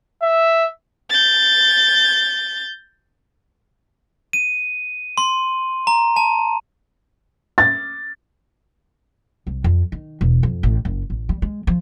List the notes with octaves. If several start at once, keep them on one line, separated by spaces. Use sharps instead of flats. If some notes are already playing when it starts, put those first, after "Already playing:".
E5
G6 A6
D#7
C6
A#5
A5
A6
C2
F2
D#3
E1
F2
A1
F#1
A1
G3
G#3
F3